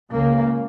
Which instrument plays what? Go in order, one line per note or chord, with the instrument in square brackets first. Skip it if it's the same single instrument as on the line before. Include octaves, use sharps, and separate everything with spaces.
[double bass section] C#2 C#3 A#3